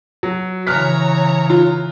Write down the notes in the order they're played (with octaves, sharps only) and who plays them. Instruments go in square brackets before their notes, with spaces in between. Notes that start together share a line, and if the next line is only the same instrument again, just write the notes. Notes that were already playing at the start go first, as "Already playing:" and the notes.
[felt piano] F#3
[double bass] C#3 E3 [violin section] C#5 A#5 [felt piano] F6 F#6 B6
[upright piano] F4